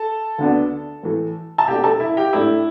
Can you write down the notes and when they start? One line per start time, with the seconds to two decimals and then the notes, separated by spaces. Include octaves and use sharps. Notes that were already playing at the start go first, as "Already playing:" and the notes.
Already playing: A4 A5
0.38 D2 D3 B3 D4
1.03 A2 E3 A3
1.58 A5
1.67 B2 A3 D4 G4 G5
1.84 A4 A5
2.00 E4 E5
2.17 G4 G5
2.33 A2 A3 D4 E4 E5